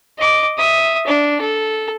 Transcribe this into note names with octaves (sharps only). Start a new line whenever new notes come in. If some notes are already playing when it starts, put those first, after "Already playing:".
D#5 D6
E5 D#6
D4
A4